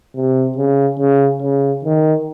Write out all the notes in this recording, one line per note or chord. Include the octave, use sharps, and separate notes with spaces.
C3
C#3
C#3
C#3
D#3